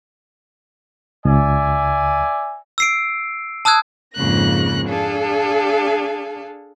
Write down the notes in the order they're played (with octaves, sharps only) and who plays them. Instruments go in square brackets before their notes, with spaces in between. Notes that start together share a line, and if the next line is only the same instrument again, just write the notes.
[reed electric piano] C#2 [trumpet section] D5 E5 G#5
[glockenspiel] E6 C7 D7
A5 D#6 E6 F#6 G#6
[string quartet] F2 G#2 C#3 A#3 F#6 A#6
D4 G#4 A4 F5